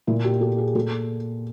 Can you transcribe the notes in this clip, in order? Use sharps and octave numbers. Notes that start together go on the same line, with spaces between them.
A#2 E4
G4
A4
G#4
A#2 A4